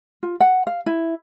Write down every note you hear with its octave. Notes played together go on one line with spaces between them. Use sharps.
F4
F#5
F5
E4